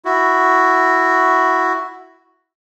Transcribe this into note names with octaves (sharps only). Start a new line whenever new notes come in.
E4 F#4